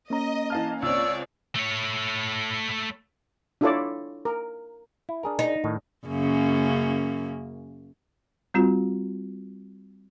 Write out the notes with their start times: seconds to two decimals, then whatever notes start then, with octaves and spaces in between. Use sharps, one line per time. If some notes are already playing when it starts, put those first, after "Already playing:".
0.10 A#3 C#4 D#5 A#5
0.50 E3 F5 A5 F6
0.82 C#2 C4 C#5 D5 E6
1.55 A3 C#5
3.61 D4 E4 F4 A4 C#5 D5
4.25 A#4
5.09 E4
5.23 D4 G#4 A#4
5.39 D#4
5.64 A2 D#3
6.07 F#2 C#3 A#3
8.54 G3 C4 F4 F#4